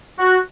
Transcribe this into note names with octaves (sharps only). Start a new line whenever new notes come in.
F#4